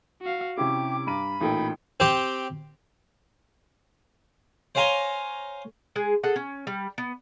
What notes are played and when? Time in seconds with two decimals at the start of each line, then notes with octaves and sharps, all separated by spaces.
0.22 F#4 F5
0.58 C3 C#4 E4 G4 D6
1.07 G2 A#5 B5 D#7
1.41 A1 A#2 D#4 A4 G5
2.00 C4 G4
4.75 C5 C#5 F5 G#5 A#5 C6
5.96 G#3 G#4
6.23 G#4 A4 F#5
6.36 C#4
6.67 G3
6.98 B3